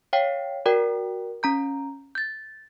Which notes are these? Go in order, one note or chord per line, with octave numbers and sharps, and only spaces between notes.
C#5 F5 G5 C7
F#4 A#4 D5 G5
C#4 A#5 G6
G6 A6